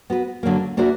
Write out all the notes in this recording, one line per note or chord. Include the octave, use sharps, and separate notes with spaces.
B3 F#4 B4
D3 F#3 A#3
A#3 D4 F#4 C#5 E5